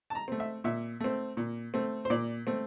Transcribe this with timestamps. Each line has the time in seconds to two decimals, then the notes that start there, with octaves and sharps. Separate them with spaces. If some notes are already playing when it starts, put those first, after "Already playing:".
0.10 A5
0.15 A#5
0.28 A3 C4
0.40 E5
0.64 A#2 E5
1.00 A3 C4
1.37 A#2
1.74 A3 C4
2.05 C5
2.10 A#2 D5
2.47 A3 C4